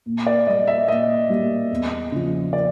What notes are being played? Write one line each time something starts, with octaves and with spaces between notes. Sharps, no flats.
A#2
D5
G3 A#3 D#5
E5
A#2 D#5
G3 A#3
E2
C#3 F3
D5